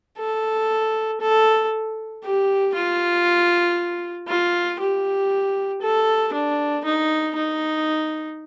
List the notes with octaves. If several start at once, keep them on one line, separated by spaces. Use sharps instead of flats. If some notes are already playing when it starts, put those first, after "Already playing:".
A4
A4
G4
F4
F4
G4
A4
D4
D#4
D#4